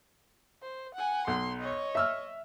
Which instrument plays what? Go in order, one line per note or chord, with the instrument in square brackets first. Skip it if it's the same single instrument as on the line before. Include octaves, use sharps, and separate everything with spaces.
[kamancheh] C5
F#5 G#5
[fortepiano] B1 [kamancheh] C6
[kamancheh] C#5 D#5
[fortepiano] E5 E6 F6